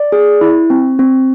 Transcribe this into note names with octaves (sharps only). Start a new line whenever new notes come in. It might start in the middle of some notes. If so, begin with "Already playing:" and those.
Already playing: D5
G#4
E4
C4
C4